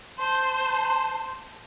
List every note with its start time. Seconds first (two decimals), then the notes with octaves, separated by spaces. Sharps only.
0.18 C5 A5 C6